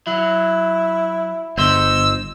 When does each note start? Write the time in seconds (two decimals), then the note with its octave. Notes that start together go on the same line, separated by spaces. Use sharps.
0.07 F#3 E4
1.58 G1 C5 D#5 C6 E6